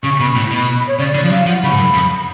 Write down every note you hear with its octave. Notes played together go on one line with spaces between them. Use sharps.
C#3 C#6
B2 B5
A2
B2
C#5
C#3 D5
D3
F3
F#3 F5
F3 F#5
C#3 B5
G#2
F#2
F2